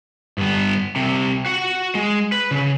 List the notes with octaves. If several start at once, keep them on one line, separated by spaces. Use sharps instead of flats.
G2 B3
C2 C3
F#4 F#5
G#3
B4
C#3